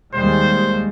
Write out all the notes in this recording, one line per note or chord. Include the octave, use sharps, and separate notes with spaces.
D#2 G3 G#3 C5